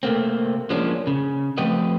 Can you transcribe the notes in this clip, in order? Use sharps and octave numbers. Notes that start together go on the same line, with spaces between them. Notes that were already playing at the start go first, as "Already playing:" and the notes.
C3 A3 A#3 C4
F3 G#3 A#3 C#4 D4
C#3
F3 A3 C4 G4 B4 D#5